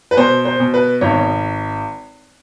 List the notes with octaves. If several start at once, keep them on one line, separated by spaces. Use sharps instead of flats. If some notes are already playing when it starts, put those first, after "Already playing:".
B4
B2 C5
C5
B2
B4
G#1 C#5